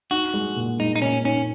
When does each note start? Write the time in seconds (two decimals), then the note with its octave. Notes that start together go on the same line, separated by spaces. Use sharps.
0.11 D#4 F#4
0.34 G#3
0.56 A#2
0.79 G#3 D#4
0.96 D#4
1.02 A#2 C#4
1.25 C#4 D#4